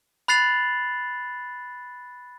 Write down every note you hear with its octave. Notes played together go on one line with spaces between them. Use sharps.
B5 F#6 A6 C7 F7 F#7